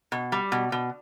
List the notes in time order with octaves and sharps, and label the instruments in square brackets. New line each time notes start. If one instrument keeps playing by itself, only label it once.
[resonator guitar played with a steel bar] B2
G3
B2
B2